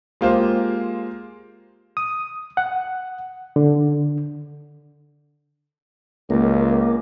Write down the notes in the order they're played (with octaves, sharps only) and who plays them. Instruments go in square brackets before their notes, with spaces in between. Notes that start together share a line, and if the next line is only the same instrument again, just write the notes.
[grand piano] G#3 A#3 F4 G4 C5
[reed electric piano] D#6
F#5
D3
[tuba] C#2 [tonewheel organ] A#3